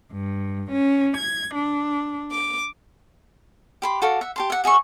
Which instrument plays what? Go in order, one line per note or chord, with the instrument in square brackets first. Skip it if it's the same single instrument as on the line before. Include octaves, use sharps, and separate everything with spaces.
[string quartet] G2
C#4
G#6
D4
D6
[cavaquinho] G4 B5 C6
F#4 A4 F5 D6
E5 F#5
G4 A5 C6
E5 F#5
F#4 G#4 E5 C#6